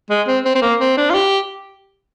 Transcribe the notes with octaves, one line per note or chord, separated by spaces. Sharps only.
G#3
C4
C4
C4
A#3
C4
D4
F4
G4